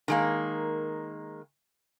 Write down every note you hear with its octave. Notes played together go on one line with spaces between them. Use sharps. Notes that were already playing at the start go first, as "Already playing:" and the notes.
D#3 G#3 A#3